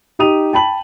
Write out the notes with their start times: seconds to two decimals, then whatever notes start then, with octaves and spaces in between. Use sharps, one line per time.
0.19 D#4 G4 D#6 D#7 F7
0.53 G5 A5 B5 F#7